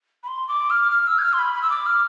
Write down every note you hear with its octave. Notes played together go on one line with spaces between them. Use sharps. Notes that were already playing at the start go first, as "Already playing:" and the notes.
B5
C6
D6
F6
F6
E6
G#6
F6
C6
B5
B5
E6
D6
F6